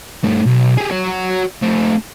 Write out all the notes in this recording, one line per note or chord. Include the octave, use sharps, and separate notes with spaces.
G2 A3
B1
G4 G#4
F#4 C#5
A3 C4